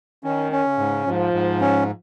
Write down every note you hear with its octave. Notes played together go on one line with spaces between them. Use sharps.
D#3 C#4
C#4
C#3
G#2
G#2 F3
G#2
C#4